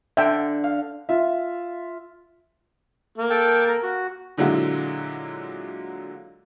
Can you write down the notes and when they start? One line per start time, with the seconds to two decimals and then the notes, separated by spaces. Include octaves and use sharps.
0.17 D3 E5 G5
0.64 F5
1.09 F4 E5
3.18 A#3
3.30 A4 G5 A5
3.69 A#4 A#5
3.83 F#4
4.37 A#2 D3 F#3 G#3 E4 F4